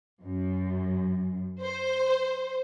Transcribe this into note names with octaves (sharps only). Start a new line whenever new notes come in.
F#2
C5